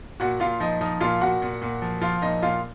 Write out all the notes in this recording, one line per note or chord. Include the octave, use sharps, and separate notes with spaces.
A#2 F#4 F#5
A#2 F4 F5
F3 D#4 D#5
F3 D#4 D#5
A#2 F4 F5
A#2 F#4 F#5
A#2
A#2
F3
F3 F4 F5
A#2 D#4 D#5
A#2 F4 F5